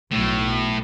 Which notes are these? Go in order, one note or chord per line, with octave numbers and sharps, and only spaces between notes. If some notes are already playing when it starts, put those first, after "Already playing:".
B1 A2